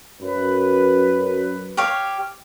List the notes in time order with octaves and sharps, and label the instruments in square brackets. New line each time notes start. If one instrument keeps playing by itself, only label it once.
[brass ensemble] F#2 B4
[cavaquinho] G4 C#5 F5